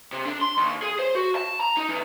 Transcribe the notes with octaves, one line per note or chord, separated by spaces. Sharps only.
C3
D4
C6
D#2
G#4
C5
F#4
A5
A#5
D#4
E2